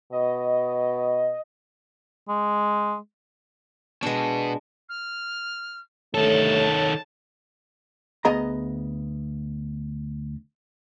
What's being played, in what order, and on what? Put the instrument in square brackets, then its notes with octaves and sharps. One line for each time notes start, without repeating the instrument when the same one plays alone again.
[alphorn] B2 [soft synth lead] D#5
[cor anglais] G#3
[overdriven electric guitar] B2 B3 [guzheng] G#3 D4
[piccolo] F6
[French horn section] D3 G3 A3 [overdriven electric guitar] D#3 A4 [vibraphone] C#5 [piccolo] A5
[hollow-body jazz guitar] D2 B3 G#4 D#5 A#5